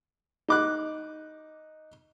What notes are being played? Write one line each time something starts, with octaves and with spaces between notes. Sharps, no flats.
D#4 D6 F#6